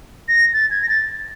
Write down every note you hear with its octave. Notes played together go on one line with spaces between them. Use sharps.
A#6
A6
G#6
A#6
A6